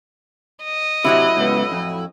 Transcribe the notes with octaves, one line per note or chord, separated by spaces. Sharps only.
D#5
A2 C3 F#3 E4
C#2 B3
F2